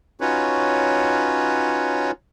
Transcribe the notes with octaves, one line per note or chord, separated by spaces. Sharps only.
C#4 D#4 F4 F#4 B4 C#5